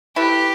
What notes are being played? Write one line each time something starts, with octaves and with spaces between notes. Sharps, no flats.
A3 E4 G4 B4